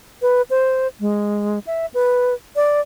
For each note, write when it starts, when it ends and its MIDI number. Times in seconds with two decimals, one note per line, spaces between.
0.22 0.42 71
0.50 0.88 72
1.00 1.59 56
1.67 1.86 76
1.94 2.34 71
2.56 2.81 74